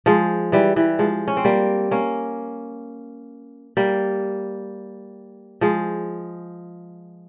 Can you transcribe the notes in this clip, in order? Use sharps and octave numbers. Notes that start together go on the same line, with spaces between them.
F3 G#3
E3 G3
E3 G3
F3 G#3
C#4
C4
G3 A#3
A#3 C#4
G3 A#3
F3 G#3